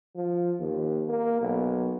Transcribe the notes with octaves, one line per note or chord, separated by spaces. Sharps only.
F3
D#2
A#3
B1